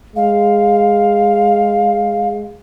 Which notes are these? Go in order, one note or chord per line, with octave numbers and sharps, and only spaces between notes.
G#3 F5